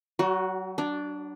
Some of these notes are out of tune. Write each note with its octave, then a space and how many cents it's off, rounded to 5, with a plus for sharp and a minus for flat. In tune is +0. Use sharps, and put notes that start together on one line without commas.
F#3 +35 F#4 +0
D4 +0 C#5 +40